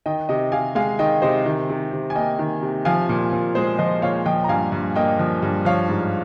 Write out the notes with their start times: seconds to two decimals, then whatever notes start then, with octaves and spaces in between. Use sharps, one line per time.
0.06 D#3 D#5 G5
0.29 C3 D#5 G5
0.52 C3 F5 G#5
0.75 G#3 F5 G#5
0.99 D#3 D#5 G5
1.22 C3 C5 D#5
1.46 D#3
1.69 C3
1.93 C3
2.10 G#5
2.15 A#3 D#5 G5
2.39 D#3
2.63 C3
2.85 F3 F5 G#5
3.09 A#2
3.33 A#2
3.55 G#3 G#4 C5
3.78 F3 C5 D#5
4.02 A#2 C#5 F5
4.26 F3 D#5 G5
4.44 A#5
4.49 G2 F5 G#5
4.72 G2
4.96 A#3 D#5 G5
5.19 F3
5.42 G2
5.65 F3 C#5 F5
5.89 G#2